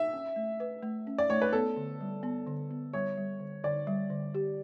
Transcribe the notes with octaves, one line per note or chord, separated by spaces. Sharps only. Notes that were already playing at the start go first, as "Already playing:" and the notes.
Already playing: E5
C#4
A3
B4
A3
C#4
D5
A3 C#5
B4
B3 A4
D3
G3
B3
D3
B3
G3 C#5
G3
D3
D3 D5
G3
D3
G4